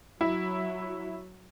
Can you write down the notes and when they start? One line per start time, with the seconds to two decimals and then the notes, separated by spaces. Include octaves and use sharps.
0.21 F#3 E4